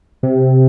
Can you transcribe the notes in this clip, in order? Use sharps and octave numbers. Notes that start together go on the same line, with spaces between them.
C3